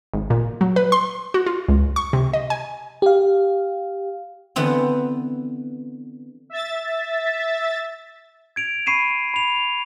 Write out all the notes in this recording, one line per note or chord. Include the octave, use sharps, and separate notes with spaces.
G#1
A#2
F#3
B4
C6
F#4
F4
C#2
C#6
C3
D#5
G#5
G4 F5
D3 E3 B3 C4
E5 A6
G#6 D7 F7
B5 C#6 C7 D#7 E7
B5 F7